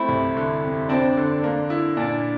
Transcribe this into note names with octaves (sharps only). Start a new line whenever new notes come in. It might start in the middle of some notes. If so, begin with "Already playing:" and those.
Already playing: A3 C4 E4
C2
D3
F2
C4 D4
D3
A#3
E4
A#2 D4